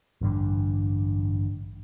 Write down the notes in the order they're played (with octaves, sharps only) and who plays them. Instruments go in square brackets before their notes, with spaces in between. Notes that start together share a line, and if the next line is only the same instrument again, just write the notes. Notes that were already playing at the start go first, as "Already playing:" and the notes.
[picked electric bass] A1 G2 D3